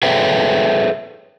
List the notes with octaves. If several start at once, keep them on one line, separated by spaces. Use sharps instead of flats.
G#4 A4 B4 C#5 E5 G5